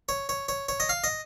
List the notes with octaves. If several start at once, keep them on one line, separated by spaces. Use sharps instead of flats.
C#5
C#5
C#5
C#5
D#5
F5
D#5